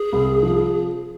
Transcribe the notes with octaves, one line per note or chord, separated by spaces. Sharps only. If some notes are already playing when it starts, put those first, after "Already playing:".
Already playing: G#4
C2
F3